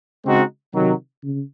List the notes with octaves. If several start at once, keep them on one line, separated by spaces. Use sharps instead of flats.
C#3 G#3 C4 D#4 F#4
C3 D#3 F#3
C#3